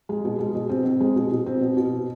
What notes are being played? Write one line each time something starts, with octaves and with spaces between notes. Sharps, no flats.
G#3
B2
G#3
B2
C4
C4
G#3
B2
B2
C4
B2
B2